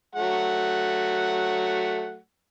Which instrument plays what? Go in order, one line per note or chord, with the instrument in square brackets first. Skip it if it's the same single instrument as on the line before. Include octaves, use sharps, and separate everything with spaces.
[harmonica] F#3 A3 F#5